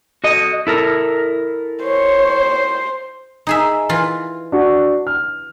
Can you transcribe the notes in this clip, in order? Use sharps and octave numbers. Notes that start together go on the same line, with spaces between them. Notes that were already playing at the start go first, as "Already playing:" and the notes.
F#4 A4 D#5
E4 A4 A#4
C5 C#5
D#4 G#4 E5
E3 F4
D4 F#4
F6